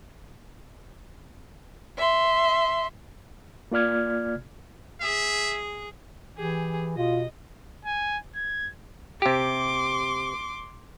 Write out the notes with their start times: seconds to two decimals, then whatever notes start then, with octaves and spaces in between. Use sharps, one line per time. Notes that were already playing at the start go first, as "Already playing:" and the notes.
1.97 E5 C6
3.72 A#3 F4 D5 F6 G#6
5.01 G#4 E5
6.37 E3 G4 G#4
6.97 B2 F4 D#5
7.85 G#5
8.36 G#6
9.22 C3 G4 C6 D6